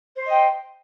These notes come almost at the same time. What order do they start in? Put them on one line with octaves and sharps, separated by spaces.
C5 C6 D#5 G5